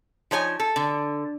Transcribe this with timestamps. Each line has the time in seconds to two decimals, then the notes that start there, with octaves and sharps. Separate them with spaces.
0.31 F3 D#4 C#5 G#5
0.60 A4
0.76 D3